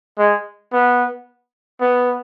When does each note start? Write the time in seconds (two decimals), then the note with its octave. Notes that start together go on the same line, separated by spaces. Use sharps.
0.18 G#3
0.73 B3
1.81 B3